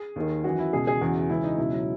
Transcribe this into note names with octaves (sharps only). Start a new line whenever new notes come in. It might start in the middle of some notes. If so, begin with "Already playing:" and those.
Already playing: G#4
D#2 D#3
F#2 E3 F#4
E4
C#2 B2 G#4
G#4
E2 C#3 E3 F#4
C#2 C#3 E3 E4
D#4
C#2 B2 E4
F#3